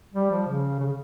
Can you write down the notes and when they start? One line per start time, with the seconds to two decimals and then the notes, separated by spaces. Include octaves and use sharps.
0.14 G3
0.31 F3
0.48 C#3
0.80 C#3